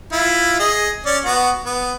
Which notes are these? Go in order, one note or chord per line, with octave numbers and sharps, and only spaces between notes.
E4 F4
G#4 D#5
C#4 D5
B3 F#4
B3